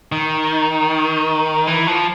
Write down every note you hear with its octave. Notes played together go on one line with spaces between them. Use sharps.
D#3
E3
F3